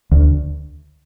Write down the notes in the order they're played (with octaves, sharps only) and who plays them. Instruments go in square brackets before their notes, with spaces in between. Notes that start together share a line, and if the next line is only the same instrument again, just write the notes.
[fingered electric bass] D2